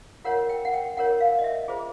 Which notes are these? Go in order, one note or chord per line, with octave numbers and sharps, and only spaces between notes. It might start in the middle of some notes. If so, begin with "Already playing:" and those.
F4 A#4 C#5 F#5
G5
F#5
G5
F4 A#4 C#5 F#5
F5
D#5
E5
F4 G#4 C5